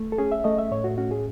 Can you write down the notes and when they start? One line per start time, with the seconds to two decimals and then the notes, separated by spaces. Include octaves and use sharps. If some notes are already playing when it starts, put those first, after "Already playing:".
Already playing: A3
0.12 A4
0.18 C#4 G#4
0.32 E5
0.44 A3 D#5
0.58 E5
0.71 A2 C#5
0.84 F#4
0.98 C#4 F#4
1.11 G#4